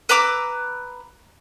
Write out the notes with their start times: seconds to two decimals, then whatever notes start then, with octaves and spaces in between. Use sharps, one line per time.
0.09 B4 A#5 D6 E6